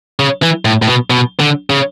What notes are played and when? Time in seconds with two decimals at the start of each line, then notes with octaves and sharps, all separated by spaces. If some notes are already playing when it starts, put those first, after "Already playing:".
0.20 C#3
0.43 E3
0.65 A2
0.82 A2
0.87 B2
1.10 B2
1.40 D3
1.70 C#3